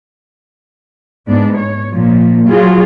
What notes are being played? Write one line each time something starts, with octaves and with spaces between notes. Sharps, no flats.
G#2 B3 D4
C#5
A#2 F3
F#3 F4 F#4 G#4